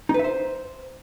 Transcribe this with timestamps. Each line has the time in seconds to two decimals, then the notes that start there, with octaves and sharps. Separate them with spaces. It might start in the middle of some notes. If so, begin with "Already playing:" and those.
0.09 D#4
0.14 B4
0.19 E5
0.24 C5